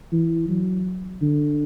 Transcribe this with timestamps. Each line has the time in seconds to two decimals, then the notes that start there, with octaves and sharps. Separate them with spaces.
0.13 E3
0.49 F#3
1.22 D3